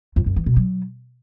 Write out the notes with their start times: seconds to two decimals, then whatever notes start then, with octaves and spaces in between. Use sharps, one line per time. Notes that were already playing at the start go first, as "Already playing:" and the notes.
0.16 F2
0.26 F#2
0.36 E3
0.46 B2
0.56 F#3